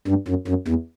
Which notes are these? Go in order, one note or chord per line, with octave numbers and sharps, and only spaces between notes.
G2
F#2
F#2
E2